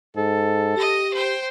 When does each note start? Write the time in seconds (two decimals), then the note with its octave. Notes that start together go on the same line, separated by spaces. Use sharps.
0.16 G#2 A4
0.77 G4 D#5 A#6
1.14 C5 G5